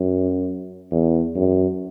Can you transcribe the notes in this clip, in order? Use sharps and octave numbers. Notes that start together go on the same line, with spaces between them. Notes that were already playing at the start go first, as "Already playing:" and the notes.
Already playing: F#2
E2
F#2